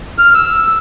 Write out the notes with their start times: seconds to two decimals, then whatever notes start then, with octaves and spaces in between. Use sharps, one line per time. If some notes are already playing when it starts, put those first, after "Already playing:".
0.18 F6
0.35 E6